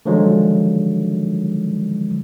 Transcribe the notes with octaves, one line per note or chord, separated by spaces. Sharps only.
D3 D#3 F3 F#3 G#3